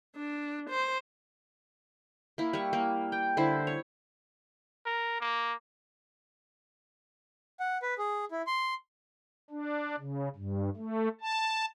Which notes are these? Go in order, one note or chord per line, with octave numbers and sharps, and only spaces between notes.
D4
C5
A#3 E4
G3 C#6
A#3
G5
D3 E4 C5
C#5
A#4
A#3
F#5
B4
G#4
E4
C6
D4
C#3
G2
A3
A5